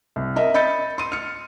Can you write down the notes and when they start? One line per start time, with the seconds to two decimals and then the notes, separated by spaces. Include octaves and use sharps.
0.16 C2
0.36 A#4 D#5 E5
0.54 D#5 B5 G6 A6 C#7
0.98 C6 D#7
1.12 F6 C#7